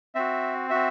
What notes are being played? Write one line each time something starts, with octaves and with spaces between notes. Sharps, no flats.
C4 F#4 E5
C4 F#4 E5